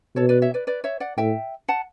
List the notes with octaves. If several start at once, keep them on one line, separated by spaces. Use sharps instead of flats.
B2 A4 C#5
B4 D5
C#5 E5
B4 D5
B4 D5
C#5 E5
D5 F#5
A2 E5 G5
F#5 A5